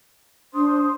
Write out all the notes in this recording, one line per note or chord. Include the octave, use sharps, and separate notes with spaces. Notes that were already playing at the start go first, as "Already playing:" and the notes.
D4 C5 C6 D#6